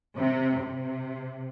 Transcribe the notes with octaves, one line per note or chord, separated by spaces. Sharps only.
C3
C3